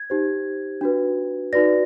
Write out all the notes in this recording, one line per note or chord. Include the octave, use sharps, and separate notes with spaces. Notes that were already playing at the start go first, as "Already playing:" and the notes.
Already playing: G#6
D#4 G4 C5
D4 F#4 B4
D#4 F#4 B4 D5 A#6